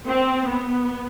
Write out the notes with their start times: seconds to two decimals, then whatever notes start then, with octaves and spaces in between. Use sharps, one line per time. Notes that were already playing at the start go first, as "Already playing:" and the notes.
0.09 C4
0.48 B3